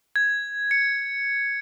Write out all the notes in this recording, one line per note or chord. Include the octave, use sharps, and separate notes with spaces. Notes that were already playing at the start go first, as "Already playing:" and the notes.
G#6
C#7